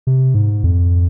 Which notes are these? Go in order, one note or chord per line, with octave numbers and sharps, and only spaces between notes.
C3
G#2
F2